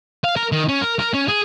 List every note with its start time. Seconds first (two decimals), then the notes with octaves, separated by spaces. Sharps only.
0.24 F5
0.36 A#4
0.52 D#3
0.69 C#4
0.81 A#4
0.99 A#4
1.14 C#4
1.28 G#4